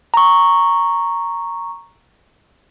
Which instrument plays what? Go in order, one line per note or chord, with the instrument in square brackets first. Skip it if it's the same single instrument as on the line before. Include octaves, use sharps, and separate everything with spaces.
[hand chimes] A#5 C#6